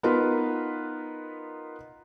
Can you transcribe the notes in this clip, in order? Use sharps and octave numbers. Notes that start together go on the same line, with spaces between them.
B3 D#4 F4 A#4 B4